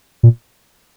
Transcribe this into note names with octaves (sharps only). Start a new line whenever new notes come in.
A#2